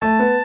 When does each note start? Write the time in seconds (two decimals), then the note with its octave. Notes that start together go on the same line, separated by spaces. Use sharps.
0.02 A3 A5
0.19 B3